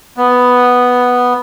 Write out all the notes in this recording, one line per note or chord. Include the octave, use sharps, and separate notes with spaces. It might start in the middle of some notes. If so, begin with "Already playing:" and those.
B3